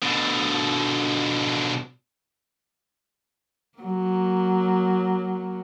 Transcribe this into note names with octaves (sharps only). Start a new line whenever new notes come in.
B2 D3
F#3 A#3